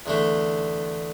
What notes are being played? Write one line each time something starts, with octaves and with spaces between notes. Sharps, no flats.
E2 D3 A3